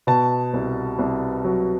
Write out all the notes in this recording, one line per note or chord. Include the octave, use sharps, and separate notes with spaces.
B2 A5
C2
C2
F#3